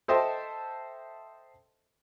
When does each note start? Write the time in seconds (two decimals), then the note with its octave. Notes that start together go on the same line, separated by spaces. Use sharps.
0.08 A4 C5 D#5 E5 G5 A5